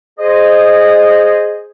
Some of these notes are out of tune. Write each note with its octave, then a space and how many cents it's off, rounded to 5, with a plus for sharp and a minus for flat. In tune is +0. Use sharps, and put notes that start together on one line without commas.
G#4 +0 C5 +0 D#5 -15